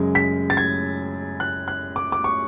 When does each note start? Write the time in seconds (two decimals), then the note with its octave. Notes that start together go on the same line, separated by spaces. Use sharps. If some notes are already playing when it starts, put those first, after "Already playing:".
Already playing: F#2 C#3 G#3
0.15 B6
0.50 A6
0.57 G#6
1.40 F#6
1.68 F#6
1.96 D6
2.12 D6
2.24 C#6